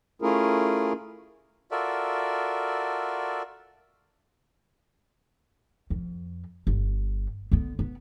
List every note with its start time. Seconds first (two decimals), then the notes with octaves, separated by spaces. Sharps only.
0.22 A3 C#4 E4 F4 G#4 A#4
1.71 F4 F#4 A4 A#4 D5 E5
5.90 F2
6.67 G1
7.52 D3 B3
7.79 B3